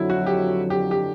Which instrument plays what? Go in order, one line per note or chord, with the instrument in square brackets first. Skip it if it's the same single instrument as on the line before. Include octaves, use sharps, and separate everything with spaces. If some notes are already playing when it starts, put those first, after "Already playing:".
Already playing: [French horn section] F2 D3 F#3 [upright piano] E4
[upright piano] F#4
G4
G4
G4